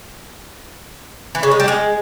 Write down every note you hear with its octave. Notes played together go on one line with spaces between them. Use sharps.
E3
C#3
G#3
G3
G#3